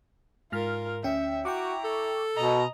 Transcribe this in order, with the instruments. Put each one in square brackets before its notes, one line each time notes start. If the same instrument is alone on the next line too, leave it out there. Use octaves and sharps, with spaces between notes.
[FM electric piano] G#2 F6 [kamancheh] F4 A#4
[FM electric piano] D2 C#4 G5 [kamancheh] E5
[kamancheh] E4 A#5 [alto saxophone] F#4 [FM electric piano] G5 C#6 D6
[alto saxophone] A4
[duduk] B2 [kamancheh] D#5 A#5